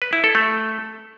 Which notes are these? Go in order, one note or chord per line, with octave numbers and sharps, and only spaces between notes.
B4
E4
A4
A3